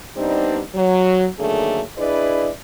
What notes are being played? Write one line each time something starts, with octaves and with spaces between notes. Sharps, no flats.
G3 B3 C4 D4 D#4
F#3
D3 D#3 F#3 A3 A#3 G#4
D4 E4 G#4 B4 D5 D#5